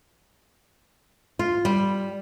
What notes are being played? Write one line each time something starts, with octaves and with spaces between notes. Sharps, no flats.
F4
G3